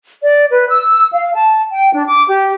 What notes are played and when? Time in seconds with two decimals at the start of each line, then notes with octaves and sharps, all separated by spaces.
0.22 D5
0.49 B4
0.68 E6
1.13 F5
1.35 A5
1.72 G5
1.91 D4
2.06 D6
2.27 G4